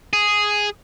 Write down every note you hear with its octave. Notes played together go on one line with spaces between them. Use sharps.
G#4